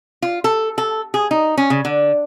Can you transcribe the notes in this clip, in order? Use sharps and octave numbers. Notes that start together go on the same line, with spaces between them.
F4
A4
A4
G#4
D#4
C#4
C#3
D3